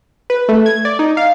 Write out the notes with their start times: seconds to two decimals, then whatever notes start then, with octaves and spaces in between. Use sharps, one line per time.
0.30 B4
0.48 A3
0.66 G#6
0.85 D5
0.99 D#4
1.17 F5